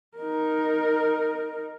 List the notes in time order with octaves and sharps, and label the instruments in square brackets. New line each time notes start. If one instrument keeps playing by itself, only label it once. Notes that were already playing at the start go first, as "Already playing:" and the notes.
[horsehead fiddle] D#4 A#4